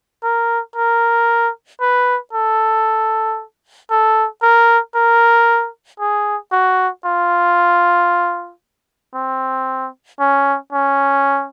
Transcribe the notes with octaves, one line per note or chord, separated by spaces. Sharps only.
A#4
A#4
B4
A4
A4
A#4
A#4
G#4
F#4
F4
C4
C#4
C#4